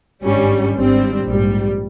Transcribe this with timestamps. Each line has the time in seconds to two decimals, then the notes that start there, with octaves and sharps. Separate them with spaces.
0.23 G#1 G2 G3 C#4
0.75 G#1 G2 G3 C4
1.26 A#1 G#2 G3